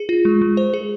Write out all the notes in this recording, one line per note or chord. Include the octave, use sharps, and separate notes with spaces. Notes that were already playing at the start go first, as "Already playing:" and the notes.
Already playing: G#4
F4
G#3
G#3
C5
G#4